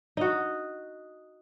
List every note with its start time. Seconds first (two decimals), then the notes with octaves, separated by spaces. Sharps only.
0.17 D#4 F#4